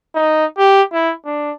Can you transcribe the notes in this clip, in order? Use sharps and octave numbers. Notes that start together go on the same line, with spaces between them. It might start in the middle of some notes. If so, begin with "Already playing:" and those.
D#4
G4
E4
D4